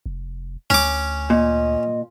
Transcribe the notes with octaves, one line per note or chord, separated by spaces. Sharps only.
F1
D2 C#4 D6
A#2 D#5